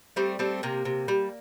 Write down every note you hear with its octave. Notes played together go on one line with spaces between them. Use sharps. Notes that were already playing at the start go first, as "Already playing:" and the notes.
G3 A3 C4
G3 A3 C4
C3 A#3
C3
G3